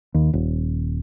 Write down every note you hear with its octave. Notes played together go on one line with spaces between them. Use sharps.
D#2
D#1